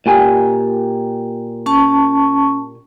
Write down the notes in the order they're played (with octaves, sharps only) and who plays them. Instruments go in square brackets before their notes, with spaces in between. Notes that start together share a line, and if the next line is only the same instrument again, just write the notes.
[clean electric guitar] A#2 G4 G#5
[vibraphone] C#4 A5 C#6